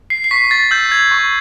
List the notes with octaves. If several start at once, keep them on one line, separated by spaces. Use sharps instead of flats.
C7
C7
C#6 B6
A6
E6 G6
G#6
C#6